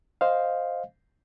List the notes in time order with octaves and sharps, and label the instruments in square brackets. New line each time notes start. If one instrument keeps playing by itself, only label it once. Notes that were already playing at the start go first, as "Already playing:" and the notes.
[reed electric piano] C5 D#5 F5